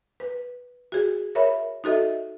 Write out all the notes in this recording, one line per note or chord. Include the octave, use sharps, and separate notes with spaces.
B4
F#4 G#4
A#4 C#5 E5 B5
D#4 F#4 A4 D#5 E5